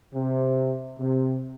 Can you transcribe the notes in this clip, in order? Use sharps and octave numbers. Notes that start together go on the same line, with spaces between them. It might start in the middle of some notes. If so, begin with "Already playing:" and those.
C3
C3